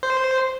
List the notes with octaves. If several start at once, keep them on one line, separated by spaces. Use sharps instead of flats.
C5